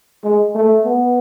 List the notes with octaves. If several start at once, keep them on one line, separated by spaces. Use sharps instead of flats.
G#3
A3
B3